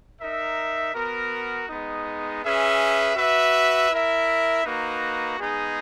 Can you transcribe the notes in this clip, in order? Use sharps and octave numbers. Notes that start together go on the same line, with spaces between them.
D#4 A#4 E5
B3 F#4 A#4
G#3 B3 D#4
C#4 G#4 B4 E5
F#4 B4 E5
E4 A#4 E5
A#3 D#4 F#4 B4
G#3 B3 D#4 G#4